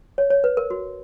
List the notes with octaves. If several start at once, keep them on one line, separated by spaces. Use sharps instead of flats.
C#5
C#5
B4
A#4
F#4